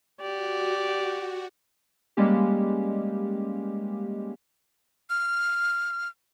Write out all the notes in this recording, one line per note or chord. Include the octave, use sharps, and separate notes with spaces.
F#4 G4 D5
G3 G#3 A#3 C#4 G4
F6